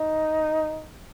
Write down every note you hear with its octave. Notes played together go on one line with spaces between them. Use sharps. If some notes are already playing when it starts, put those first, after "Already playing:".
Already playing: D#4